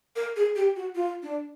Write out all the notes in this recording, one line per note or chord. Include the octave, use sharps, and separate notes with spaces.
A#4
G#4
G4
F#4
F4
D4